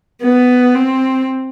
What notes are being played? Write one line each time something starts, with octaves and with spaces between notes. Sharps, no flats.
B3
C4